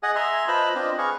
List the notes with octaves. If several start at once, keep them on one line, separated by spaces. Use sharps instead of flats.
G#4 D#5 F#5 G#5
E5 G#5 A#5 C6
F4 B4 C5 D#5 A5 B5
C4 D4 F4 D#5
G#4 B4 F5 G#5 C#6